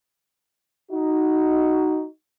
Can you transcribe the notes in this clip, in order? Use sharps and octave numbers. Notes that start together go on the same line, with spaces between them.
D#4 F#4